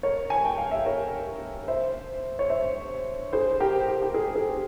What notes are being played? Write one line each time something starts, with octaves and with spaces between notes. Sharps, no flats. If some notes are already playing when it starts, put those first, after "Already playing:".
A#4 C#5
G#5
G5
F5
E5
A#4 C#5
C5 E5
C#5
C5 E5
G#4 C5
G4 A#4
G4
G4
G#4
G#4